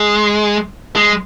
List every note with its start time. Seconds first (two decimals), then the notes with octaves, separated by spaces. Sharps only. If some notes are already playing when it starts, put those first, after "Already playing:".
Already playing: G#3
0.96 G#3